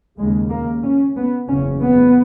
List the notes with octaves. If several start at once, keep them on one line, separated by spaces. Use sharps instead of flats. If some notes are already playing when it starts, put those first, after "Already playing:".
D#2 C#3 G#3
A#3
C#4
B3
F#1 E2 C#3 C#4
B3